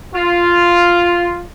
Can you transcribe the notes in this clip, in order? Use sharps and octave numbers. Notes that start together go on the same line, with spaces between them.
F4